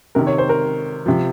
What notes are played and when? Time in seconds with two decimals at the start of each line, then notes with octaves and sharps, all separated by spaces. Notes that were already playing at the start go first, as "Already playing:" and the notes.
0.15 C3 D#3 A#4
0.27 C#5
0.38 C5
0.49 A#4
1.06 C3 F3